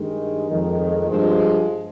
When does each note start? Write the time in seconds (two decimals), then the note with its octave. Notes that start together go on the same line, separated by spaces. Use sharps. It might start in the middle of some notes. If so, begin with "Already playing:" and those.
Already playing: G2 D#3 G#3
0.48 F2 D#3 G#3
1.07 G2 F3 G#3 C4